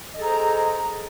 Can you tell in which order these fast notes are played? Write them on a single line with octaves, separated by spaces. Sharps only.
D#5 A4 G#4 A#5 C5